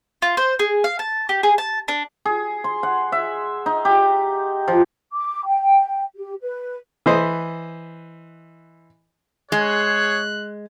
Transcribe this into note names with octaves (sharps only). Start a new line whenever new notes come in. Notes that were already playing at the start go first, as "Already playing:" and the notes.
F4
C5
G#4
F5
A5
G4
G#4
A5
D4
G#4
C6
F#5
E5
D#4
G4
F3
D6
G5
G4
B4
E3 B4 C5 D#5
G#3 G#4 C#5 F#6